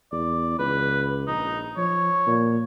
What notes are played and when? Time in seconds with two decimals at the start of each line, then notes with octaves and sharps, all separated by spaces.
0.12 E2 D5
0.59 C#2 B4
1.27 A#1 D#4
1.77 F3 C#5
2.27 A#2